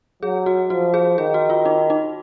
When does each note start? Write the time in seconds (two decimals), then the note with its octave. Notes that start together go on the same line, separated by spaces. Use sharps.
0.22 F#3 G#4
0.46 F#4
0.70 F3 F#4
0.94 G#4
1.18 D#3 G#4
1.34 F#4
1.50 F4
1.65 D#4
1.90 D#4